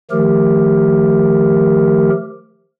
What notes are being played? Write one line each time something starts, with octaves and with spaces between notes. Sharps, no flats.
D#3 F3 A3 G4 A#4